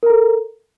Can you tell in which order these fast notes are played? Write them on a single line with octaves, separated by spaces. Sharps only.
A#4 A#5 A4